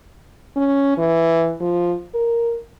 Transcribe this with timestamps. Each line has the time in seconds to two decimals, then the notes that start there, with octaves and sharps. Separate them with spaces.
0.56 C#4
0.98 E3
1.60 F3
2.14 A#4